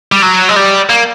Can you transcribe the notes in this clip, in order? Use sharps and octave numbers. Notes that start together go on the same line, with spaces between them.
G3
F#3
G#3
G3
A#3